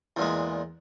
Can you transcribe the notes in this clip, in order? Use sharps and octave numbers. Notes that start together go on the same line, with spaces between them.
E2 A#2 G#3